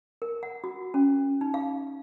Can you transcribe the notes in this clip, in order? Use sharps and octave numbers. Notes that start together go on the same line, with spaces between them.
A#4
F#5
F#4
C#4
D#4
F5